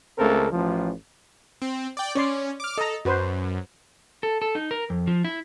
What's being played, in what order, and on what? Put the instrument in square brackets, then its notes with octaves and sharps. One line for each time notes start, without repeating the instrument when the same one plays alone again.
[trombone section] C#2 C#3 A3 C4 A4 A#4
A1 F3
[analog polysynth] C4
D5 G5
[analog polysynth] C#4 [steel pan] C#5 D5 C6
[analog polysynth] D6 F6
[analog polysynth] A4 [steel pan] D#5 A#5
[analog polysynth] F#2 [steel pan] F#4 B4 C5
[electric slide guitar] A4
A4
D#4
A#4
F2
F3
E4